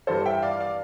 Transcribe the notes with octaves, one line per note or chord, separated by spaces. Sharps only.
G2 E3 G3 A4 C5
E5 G5
D5 F5
D5 F5